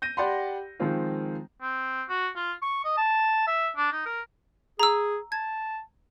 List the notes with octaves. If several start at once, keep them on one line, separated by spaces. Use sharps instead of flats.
G6 A#6 D#7
G4 D5 F#5 B5 C6
D#3 F3 G#3 C4 F4
C4
F#4
F4
C#6
D#5
A5
E5
D4
D#4
A#4
G#4 A#5 E6
A5 G#6